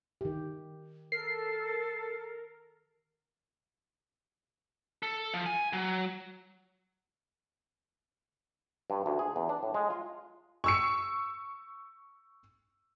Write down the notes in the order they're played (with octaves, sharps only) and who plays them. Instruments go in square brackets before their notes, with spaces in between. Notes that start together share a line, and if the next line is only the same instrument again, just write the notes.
[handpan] D#3 G4
[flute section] A4 [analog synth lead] A#4 [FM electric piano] C7
[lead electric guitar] A4
F3
G#5
F#3
[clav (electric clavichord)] G2
D2
G#4
E2
D4
A2
G#3
F4
[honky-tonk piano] C#6 E6 C#7